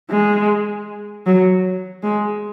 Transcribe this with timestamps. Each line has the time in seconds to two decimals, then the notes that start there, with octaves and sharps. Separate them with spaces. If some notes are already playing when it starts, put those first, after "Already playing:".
0.11 G#3
1.27 F#3
2.03 G#3